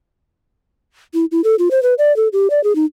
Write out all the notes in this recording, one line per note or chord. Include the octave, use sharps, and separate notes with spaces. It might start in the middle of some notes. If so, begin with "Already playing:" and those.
E4
E4
A4
F4
C5
B4
D5
A4
G4
D5
G#4
D#4